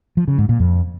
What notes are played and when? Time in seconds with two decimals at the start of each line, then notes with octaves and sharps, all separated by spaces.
0.17 F3
0.28 C#3
0.38 G#2
0.49 A#2
0.60 F2